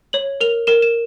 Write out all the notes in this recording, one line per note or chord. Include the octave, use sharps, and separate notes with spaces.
C#5 F#7
A#4 F7
A#4 E7
E7